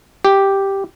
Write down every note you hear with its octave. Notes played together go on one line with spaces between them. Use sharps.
G4